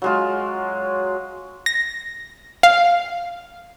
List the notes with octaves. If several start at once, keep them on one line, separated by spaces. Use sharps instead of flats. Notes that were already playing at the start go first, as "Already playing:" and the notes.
F#3 G#3 F4
A#6
F5